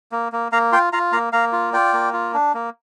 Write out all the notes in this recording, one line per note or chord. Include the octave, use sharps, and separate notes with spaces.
A#3
A#3
A#3 F5 A#5
F4 G5 C6
F4 F5 A#5
A#3 F5 A#5
A#3 F5 A#5
F4
F4 D5 G5
A#3
F4
D4
A#3